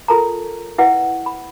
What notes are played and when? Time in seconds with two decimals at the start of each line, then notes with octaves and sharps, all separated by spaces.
0.08 F4 A4 A#4 A5 A#5
0.78 E4 B4 E5 F#5
1.26 B5